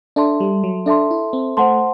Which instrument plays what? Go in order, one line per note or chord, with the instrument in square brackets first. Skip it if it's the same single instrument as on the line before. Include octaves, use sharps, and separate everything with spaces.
[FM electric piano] D4 [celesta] A4 E5 A5 C6
[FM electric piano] G3
F#3
[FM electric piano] D4 [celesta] A4 E5 A5 C6
[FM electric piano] E4
C4
[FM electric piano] A3 [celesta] C5 F#5 A5 C6